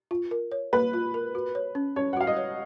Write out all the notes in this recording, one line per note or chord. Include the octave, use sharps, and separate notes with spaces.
F4
A#4
C#5
A#3 B4
F4
A#4
F#4
C#5
C#4
C#4 C#5
F#5
F#4 F5
D#5
C#5